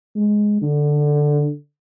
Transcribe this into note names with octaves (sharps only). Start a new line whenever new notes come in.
G#3
D3